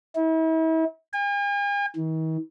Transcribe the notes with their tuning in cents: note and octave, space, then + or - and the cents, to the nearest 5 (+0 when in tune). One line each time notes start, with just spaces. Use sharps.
E4 -40
G#5 -45
D#3 +45